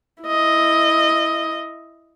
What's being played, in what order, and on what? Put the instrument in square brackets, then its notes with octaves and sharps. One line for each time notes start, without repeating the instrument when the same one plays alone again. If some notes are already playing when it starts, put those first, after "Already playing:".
[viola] E4 D#5